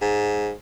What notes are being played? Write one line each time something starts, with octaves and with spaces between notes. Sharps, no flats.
G#2